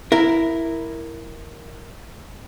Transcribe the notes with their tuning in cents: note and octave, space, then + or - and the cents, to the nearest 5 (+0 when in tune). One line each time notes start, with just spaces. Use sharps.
E4 +0 A#4 +0